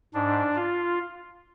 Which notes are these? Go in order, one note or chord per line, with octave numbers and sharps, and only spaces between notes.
G#2 D4
F4